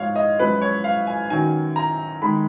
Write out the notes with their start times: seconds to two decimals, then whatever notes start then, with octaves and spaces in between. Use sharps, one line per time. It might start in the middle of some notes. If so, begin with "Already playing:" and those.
Already playing: G#2 F3 G#3 C#5 F5
0.16 D#5
0.39 F#2 F3 G#3 B4
0.61 C#5
0.84 F5
1.07 G#5
1.30 F#2 D#3 F#3 G#5
1.76 A#5
2.22 D#3 G#3 B5